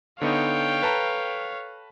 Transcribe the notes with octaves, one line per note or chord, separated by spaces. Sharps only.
D3 B3 D#4 A4 C#5 F5 G5
B4 A5 A#5